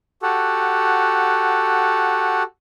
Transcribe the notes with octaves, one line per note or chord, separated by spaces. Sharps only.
F#4 G4 A4 F#5